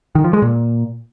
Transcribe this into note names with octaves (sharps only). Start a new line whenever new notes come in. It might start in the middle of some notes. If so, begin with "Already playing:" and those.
D#3
F3
G#3
A#2